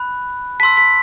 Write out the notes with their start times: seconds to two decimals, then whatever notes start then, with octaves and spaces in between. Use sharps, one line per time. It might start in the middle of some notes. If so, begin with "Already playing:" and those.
Already playing: B5 F#6
0.60 A5 B6
0.63 C6 E6
0.77 B6